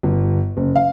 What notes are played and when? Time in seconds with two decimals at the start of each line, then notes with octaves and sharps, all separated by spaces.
0.03 G1
0.57 F#1
0.76 F5